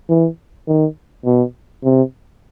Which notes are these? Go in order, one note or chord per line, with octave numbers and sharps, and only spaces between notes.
E3
D#3
B2
C3